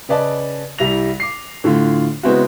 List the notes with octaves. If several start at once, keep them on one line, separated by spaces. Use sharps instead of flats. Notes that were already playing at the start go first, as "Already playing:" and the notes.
C#3 B4 D5 D#5 A5
C2 G3 E4 A#6 F7
D6 C7
A2 D3 F4
C#3 G#3 B3 C4 E4 F#4